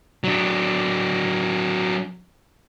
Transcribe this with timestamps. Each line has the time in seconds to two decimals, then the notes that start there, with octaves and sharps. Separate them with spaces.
0.24 F#3 D4